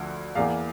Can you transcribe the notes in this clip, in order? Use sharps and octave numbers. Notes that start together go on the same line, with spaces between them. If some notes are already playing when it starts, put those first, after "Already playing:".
Already playing: D2 D3 F3
E2 E3 A#3 F5